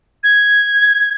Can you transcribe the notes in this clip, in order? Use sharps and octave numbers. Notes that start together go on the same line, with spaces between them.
G#6